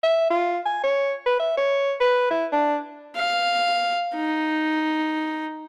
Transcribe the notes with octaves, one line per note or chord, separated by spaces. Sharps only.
E5
F4
G#5
C#5
B4
E5
C#5
B4
E4
D4
F5
D#4